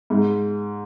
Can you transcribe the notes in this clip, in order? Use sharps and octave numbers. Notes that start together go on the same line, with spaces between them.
G#2